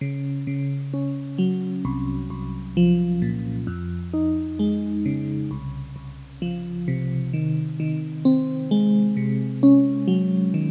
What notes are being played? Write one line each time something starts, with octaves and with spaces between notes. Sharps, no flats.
C#3
C#3
C#4
F#3
C2
C2
F3
A#2
F2
D#4
G#3
C#3
C2
C2
F3
C3
D#3
D#3
C4
G#3
C3
C#4
F#3
D#3